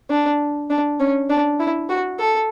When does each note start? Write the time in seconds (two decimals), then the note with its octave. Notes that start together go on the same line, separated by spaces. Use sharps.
0.10 D4
0.70 D4
1.00 C#4
1.30 D4
1.60 E4
1.89 F#4
2.19 A4